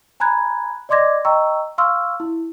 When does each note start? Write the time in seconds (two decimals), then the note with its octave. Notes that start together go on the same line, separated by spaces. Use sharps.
0.20 G#5 A#5 B5 F#6 G#6
0.89 D5 D#5 C6 D6 G#6 A#6
1.25 D#5 G5 A#5 C#6 E6
1.78 F5 C6 C#6 E6 F6
2.20 E4